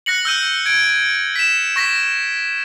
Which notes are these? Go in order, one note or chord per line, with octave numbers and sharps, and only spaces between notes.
F#6 A#6 C#7 F#7
E6 G6 D#7
G#6 D7
B6 E7
C#6 A#6 B6